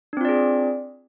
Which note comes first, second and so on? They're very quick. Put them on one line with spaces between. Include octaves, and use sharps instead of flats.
D4 C4 F4 D5 G#4